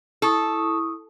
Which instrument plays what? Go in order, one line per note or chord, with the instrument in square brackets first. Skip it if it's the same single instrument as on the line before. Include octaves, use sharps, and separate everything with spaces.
[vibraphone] E4 C#6 D#6 [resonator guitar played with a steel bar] A4